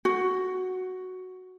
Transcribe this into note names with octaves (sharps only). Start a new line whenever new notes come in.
F#4